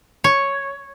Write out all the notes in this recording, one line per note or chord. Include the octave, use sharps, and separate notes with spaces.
C#5